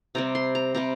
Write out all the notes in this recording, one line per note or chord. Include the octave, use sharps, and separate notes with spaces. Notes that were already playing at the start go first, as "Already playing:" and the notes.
C3 G3 C4 A#5
C6
A#5
C3 G3 C4 A#5